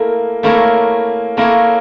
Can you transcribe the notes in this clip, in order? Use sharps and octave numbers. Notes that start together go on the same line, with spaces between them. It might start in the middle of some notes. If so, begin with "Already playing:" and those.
Already playing: A3 A#3 E4 A#4
A3 A#3 E4 A#4 C#5
A3 A#3 E4 A#4 C#5